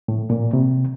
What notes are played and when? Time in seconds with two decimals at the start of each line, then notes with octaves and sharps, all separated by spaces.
0.08 A2
0.30 A#2
0.53 C3